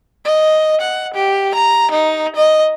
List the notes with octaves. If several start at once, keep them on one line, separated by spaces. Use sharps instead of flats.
D#5
F#5
G4
A#5
D#4
D#5